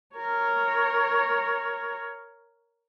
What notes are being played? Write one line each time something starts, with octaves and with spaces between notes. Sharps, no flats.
A#4 C#5